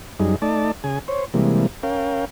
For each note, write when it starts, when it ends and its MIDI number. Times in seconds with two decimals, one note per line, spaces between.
0.20 0.36 42
0.20 0.36 55
0.20 0.36 63
0.20 0.36 68
0.42 0.71 57
0.42 0.71 63
0.42 0.71 74
0.42 0.71 81
0.84 0.99 49
0.84 0.99 68
0.84 0.99 80
1.08 1.25 72
1.08 1.25 73
1.34 1.67 48
1.34 1.67 52
1.34 1.67 55
1.34 1.67 56
1.34 1.67 58
1.83 2.25 61
1.83 2.25 70
1.83 2.25 77
1.83 2.25 79